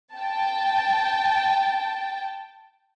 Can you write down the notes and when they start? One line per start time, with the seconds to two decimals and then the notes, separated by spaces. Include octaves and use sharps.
0.15 G5 A5